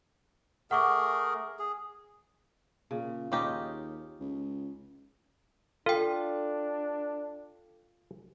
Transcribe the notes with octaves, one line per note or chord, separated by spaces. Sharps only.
A3 G#4 A#4 F#5 C#6 D6
G#4
A#2 C#3
D#2 C#4 D#4 F4 G4 D#5
C#2
D4 F4 A4 G5